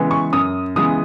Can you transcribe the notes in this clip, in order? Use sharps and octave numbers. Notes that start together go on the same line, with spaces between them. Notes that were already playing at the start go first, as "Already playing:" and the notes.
Already playing: C#3 E3 G#3 B3
C#6
F#2 D#6
C#3 E3 G#3 B3 D#6